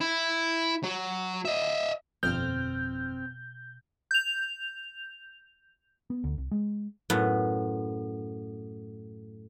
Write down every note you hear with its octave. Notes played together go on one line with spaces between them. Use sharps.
E4
F#3
D#5 E5
G1 F2 B2 C4 F6 G6
G6 F7
B3
D2
C2
G#3
F#2 A2 B3